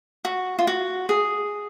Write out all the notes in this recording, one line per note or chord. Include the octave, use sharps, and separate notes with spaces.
F#4
F4
F#4
G#4